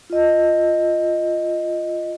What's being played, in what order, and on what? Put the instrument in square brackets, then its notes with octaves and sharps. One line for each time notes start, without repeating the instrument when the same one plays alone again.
[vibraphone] F4 D#5